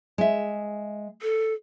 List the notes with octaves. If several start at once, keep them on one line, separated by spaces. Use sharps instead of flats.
G#3 E5
A4